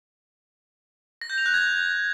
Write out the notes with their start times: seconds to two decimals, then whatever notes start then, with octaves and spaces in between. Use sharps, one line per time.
1.21 A#6
1.30 G6
1.38 F7
1.46 F#6
1.54 G#6